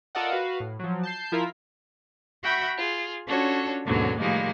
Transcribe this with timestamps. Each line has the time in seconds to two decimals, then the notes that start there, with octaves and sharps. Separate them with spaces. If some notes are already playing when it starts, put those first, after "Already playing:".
0.15 F4 A4 A#4 D5 D#5 F#5
0.31 F#4 B4 F5
0.60 A2
0.79 F3 F#3
1.03 A5 G6 C7
1.32 F3 E4 F4 A#4 B6
2.43 F#4 E5 F#5 G5 B5 C#6
2.78 F4 G#4
3.27 C#4 D4 F4 F#4 A4 C#5
3.86 D#2 G#2 B2 D3 F#3 C#4
4.19 A2 D#3 F3 G3 G#3 A#3